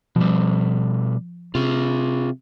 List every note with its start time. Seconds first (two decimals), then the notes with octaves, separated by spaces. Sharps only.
0.16 B2 F3 G3
1.55 C3 F4 G#4